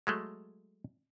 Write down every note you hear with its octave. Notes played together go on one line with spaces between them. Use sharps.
F#3 G#3 A3